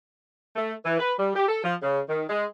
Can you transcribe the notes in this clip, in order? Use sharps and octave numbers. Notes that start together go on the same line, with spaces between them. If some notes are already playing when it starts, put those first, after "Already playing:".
A3
E3
B4
G3
G4
A4
F3
C#3
D#3
G#3